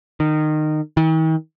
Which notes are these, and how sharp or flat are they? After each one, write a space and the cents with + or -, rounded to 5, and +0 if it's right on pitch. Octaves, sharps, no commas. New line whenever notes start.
D#3 -20
D#3 +45